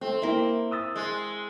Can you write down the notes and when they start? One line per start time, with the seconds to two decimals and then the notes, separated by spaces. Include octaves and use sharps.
0.01 A3 C4
0.22 A#3 E4 A#4 E5
0.71 D#6 E6 A6
0.96 G#3